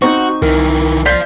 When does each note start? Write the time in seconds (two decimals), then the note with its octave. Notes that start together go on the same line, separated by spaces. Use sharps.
0.02 C4 D#4 F#4 C#6
0.42 C2 D#3 E3 A#4
1.06 C5 D5 F5 G6 B6